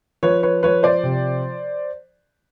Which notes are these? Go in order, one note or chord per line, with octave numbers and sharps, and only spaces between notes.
F3 B4 C#5
B4 C#5
F3 B4 C#5
C5 D5
C3